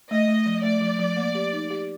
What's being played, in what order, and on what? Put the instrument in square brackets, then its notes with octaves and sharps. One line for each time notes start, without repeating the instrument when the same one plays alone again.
[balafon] A3 [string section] D#5
[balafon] A3
F3
[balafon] A3 [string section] D5
[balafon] F3
F3
A#3
G4
D#4
G4